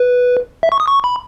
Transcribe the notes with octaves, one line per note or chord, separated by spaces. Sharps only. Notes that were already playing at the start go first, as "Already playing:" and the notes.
Already playing: B4
E5
C#6
D#6
C#6
B5